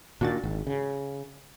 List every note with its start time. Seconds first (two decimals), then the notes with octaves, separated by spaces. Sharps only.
0.21 A#2 D#3 D4 F#4 A6
0.44 G#1
0.67 C#3